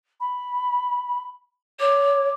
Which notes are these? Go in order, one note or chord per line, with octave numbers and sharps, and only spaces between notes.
B5
C#5 D6